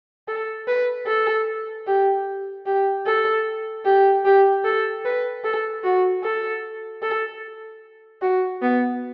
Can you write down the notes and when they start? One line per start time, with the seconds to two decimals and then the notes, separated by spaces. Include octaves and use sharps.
0.28 A4
0.67 B4
1.07 A4
1.87 G4
2.66 G4
3.06 A4
3.85 G4
4.25 G4
4.64 A4
5.05 B4
5.44 A4
5.84 F#4
6.23 A4
7.02 A4
8.22 F#4
8.62 B3